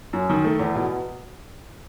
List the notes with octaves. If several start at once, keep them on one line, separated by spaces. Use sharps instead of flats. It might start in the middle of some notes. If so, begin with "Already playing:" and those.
F#2
D#3
A3
E2
B2